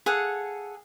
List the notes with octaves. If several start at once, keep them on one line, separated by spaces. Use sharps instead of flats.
G#4 A4 F5 F#5